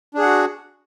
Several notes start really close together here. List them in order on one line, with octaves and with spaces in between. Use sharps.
D4 G#4 F#5 F#4